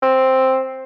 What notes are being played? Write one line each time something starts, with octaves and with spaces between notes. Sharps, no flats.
C4